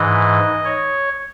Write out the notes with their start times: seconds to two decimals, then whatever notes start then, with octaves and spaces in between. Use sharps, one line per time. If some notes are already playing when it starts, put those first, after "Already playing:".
Already playing: G#2 E3 D#5
0.65 C#5